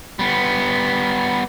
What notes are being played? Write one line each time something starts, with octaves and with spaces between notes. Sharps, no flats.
G3 B3